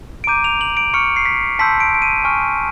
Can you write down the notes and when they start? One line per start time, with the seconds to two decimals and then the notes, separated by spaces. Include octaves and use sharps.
0.24 D7
0.27 A#5 D6 G6 D#7
0.44 F7
0.61 F#7
0.77 D7
0.94 C#6 F6 C#7
1.16 C7
1.26 B6
1.59 A5 C6 E6 G6 B6
1.80 D7
1.95 D7
2.02 D#7
2.24 G#5 C#6 F6